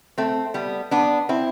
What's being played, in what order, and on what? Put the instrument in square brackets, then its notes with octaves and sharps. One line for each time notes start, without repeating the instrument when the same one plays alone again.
[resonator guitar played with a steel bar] A3 C4
G3 B3
B3 D4
C4 E4